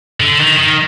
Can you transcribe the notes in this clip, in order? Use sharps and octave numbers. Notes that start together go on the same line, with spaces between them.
D3
D#3
D#3